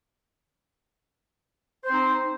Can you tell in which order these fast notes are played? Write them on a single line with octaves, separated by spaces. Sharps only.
C5 C4 D#4